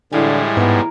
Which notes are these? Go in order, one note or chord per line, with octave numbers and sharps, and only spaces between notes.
A2 D3 E3 G3 G#3 F5 G#5
G#2 B3 A#4 C#5